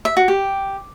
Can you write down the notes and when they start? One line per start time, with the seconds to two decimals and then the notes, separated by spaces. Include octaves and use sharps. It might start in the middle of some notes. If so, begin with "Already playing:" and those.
0.05 E5
0.17 F#4
0.28 G4